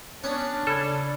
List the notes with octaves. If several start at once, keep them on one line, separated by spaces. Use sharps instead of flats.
B3 C#4 D4
C#3 A4 B5 G#6